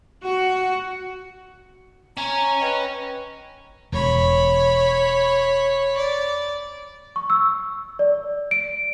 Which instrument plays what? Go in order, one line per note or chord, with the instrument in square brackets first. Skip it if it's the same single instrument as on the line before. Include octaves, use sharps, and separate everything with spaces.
[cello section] F#4
[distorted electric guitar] C#4 G#5 [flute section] A#5
[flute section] B4 D#5 G5
[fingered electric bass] E1 [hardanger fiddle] C#5 B5
[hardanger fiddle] D5
[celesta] C#6
E6
D5
D7